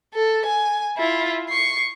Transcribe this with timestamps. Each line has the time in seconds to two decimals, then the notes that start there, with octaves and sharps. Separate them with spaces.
0.14 A4
0.45 G#5
0.98 E4 F4
1.49 C#6 C7